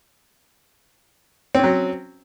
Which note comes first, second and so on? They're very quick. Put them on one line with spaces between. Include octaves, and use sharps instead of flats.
C4 C#4 F#3